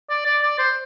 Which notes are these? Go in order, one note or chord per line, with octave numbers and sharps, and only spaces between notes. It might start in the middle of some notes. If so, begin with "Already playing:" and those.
D5
D5
D5
C5